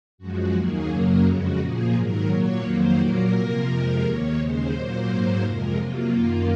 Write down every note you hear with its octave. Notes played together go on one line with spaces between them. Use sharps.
F#2 F3 G#3 F#4
D#2 D#3 F#3 A#3 G#4
F#2 C#3 F#3 A#3 A#4
F2 C#3 G#3 F#4
A#2 F3 A#3 G#4
G#2 D#3 F#3 A#4
A#2 F#3 A#3 C#5
F2 D#3 F#3 A#3 C5
A#2 F#3 A#3 A#4
C3 F3 A#3
F2 C3 F3 G#3
D#2 D#3 A#3 C#5
D#2 C#3 G#3 C5
A#2 F#3 A#3 C5
G#2 F#3 A#3
F2 C3 F3 G#3 A#4
C3 F#3 A#3 F4
F#2 D#3 A#3 F4